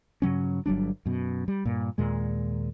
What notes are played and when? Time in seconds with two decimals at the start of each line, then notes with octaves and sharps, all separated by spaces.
0.22 G2 C#3 F#3 C#4
0.66 G1 F#3 G3 D4
1.06 F#2 B2
1.48 G3
1.65 G2 A#2
1.98 D#2 A#2 G#3